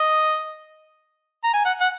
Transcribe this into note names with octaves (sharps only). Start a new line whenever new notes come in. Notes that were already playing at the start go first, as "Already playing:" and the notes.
Already playing: D#5
A#5
G#5
F#5
F#5